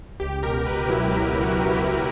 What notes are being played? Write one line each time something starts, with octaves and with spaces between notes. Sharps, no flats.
C#2 G4
B2 A#4
C#2 B4
F#3 E4
C#2 E4
B2
F#4
C#2
G4
F#3